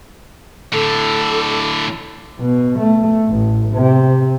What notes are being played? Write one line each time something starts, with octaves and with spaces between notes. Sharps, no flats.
A2 D3 A4
B2
A3
A1
C3